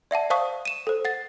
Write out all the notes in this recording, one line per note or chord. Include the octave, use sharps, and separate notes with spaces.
D5 E5 F#5 A5
C5 F5 A5 C#6 D#6
D#7 E7
A4 C5
F#5 A6